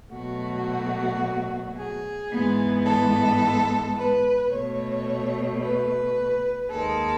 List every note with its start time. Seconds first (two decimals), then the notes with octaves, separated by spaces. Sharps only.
0.13 B2 F#3 A3 F#4
1.77 G#4
2.32 G#2 E3 G#3 B3
2.87 A4
3.97 B4
4.51 B2 A3 C#5
5.62 B4
6.71 D#2 D#3 G#3 A4